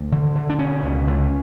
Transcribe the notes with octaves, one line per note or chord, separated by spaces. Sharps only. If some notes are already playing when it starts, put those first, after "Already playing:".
Already playing: D2
D3
D3
D4
B2 C#4
C#2
C#2